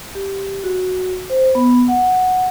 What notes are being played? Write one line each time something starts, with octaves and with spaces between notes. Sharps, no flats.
G4
F#4
C5
B3
F#5